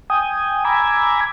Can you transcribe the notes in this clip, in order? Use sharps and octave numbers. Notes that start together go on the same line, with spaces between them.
G5 G#5 D#6
G#5 A#5 B5 D6 E6 G#6